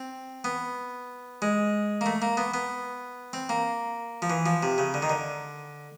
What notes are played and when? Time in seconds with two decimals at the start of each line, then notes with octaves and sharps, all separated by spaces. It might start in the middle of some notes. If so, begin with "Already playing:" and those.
Already playing: C4
0.44 B3
1.42 G#3
2.01 A#3
2.06 A3
2.22 A#3
2.37 B3
2.54 B3
3.33 C4
3.49 A#3
4.22 F3
4.30 E3
4.46 F3
4.63 C3
4.78 C#3
4.94 D3
5.02 D#3
5.10 D3